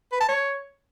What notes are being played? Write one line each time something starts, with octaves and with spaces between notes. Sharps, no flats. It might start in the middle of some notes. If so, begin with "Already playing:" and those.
B4
A5
C#5